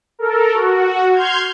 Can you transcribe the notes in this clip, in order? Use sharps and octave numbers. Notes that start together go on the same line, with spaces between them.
A4 A#4
F#4
C6 F6 G6 G#6